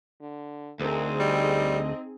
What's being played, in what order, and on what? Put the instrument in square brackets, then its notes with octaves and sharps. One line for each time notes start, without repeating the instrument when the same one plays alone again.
[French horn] D3
[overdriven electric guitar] D2 [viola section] C4 D#4 G#4 [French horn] A#4
[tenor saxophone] G3 [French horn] D#5